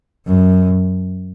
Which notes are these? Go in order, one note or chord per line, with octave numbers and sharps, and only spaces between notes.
F#2